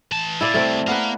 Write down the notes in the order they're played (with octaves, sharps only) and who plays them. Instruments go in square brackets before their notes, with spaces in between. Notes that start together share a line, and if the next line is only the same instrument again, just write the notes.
[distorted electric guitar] E3 A5
[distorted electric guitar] A#2 [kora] E4 A4 D5
[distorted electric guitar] C2 C3 [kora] A3 C4
[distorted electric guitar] A#3 F5 [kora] B3 B4